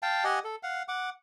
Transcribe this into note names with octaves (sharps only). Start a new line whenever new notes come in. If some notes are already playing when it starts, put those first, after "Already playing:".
F5 G5 A5
G4 D#5 F#5 G#5
A4
F5 F#5
F#5 D6